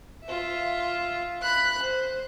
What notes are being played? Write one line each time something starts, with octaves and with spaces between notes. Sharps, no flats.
F4 E5
B5 F#6
C5